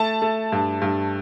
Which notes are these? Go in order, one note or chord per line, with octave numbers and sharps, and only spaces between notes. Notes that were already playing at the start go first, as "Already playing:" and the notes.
Already playing: A3 A5
A3
G2
G2